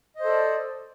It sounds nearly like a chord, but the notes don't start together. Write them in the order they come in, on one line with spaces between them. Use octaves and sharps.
D#5 C5 A4 D5